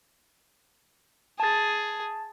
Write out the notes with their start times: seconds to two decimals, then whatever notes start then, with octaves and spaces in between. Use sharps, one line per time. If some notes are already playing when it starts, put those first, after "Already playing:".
1.40 G#4 A5 A6